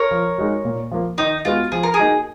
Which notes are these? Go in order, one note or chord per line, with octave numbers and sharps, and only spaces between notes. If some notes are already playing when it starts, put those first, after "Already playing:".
Already playing: A#4 C#5
F3
G#3 D#4 F#4
A#2
F3 A#3
D#3 D#4
G#3 B3 F4 F#4
F3 G#4
A#4
G#4
A#3 D#4 F#4